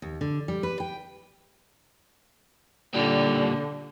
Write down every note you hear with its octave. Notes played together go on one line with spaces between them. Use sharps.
D#2
D3
G3
B4
G5
A#2 D3 G3